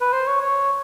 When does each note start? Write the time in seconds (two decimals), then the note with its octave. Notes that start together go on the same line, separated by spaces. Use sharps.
0.01 B4
0.13 C5
0.27 C#5
0.41 C#5